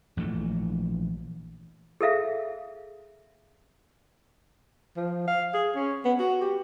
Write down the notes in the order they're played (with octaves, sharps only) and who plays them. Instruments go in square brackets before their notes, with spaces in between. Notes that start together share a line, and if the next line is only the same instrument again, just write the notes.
[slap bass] A#1 E3 A3
[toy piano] G#4 A4 E5 F5
[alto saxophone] F3
F5
G#4
C#4
B3
F#4
G4